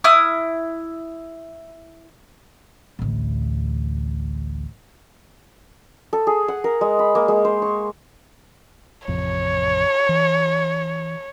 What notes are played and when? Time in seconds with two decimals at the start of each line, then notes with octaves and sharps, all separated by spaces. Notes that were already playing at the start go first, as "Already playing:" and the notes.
0.04 E4 D#6 F6
2.99 A1 D2
6.13 A4
6.27 G#4
6.48 F#5
6.64 A#4
6.81 G#3
6.99 B5
7.15 A#3
7.28 G#3
7.45 C5
7.62 C#6
9.08 A1 F2 C3 C#5
10.09 E3